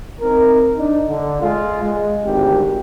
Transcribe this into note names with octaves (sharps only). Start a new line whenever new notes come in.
C4 D#4 A#4
D4 D#4
D3
G#3 F4
G#3
G#1 D2 G4